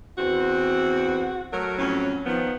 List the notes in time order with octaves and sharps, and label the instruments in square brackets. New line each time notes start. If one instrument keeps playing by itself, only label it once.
[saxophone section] E2 C4 [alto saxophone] F#4
[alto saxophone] F#3 [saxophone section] A3 A#4
[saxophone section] F2 A2 C#4
[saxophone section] D#3 F3 [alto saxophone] B3